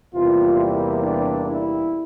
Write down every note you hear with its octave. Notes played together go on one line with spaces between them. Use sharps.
E2 C3 G3 A#3 F4
E4
D4
E4